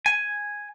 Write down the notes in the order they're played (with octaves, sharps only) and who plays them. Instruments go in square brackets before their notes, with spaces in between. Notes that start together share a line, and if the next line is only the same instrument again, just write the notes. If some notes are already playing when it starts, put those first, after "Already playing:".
[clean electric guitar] G#5